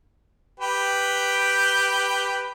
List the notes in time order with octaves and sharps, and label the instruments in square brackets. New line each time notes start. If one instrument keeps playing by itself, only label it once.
[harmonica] G4 B4 G5